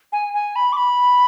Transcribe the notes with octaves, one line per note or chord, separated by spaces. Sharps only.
G#5
G#5
B5
D6
B5